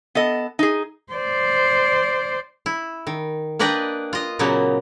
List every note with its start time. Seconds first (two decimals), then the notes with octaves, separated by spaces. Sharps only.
0.15 B3 A4 D#5
0.59 D#4 G#4
1.13 C5 D5
2.66 E4
3.07 D#3
3.59 A#3 D4 B4 D5 D#5 G5
4.13 F4 D#5
4.39 A#2 C#3 F#3 A#3 B3